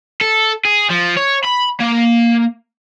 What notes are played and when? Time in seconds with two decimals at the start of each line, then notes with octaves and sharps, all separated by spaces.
0.21 A4
0.65 G#4
0.90 F3
1.17 C#5
1.45 B5
1.80 A#3